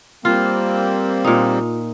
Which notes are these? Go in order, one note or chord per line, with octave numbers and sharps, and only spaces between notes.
G3 A#3 C4 F4
A#2 D#4